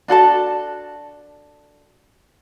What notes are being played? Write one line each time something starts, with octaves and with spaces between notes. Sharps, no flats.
D4 F#4 A4 A5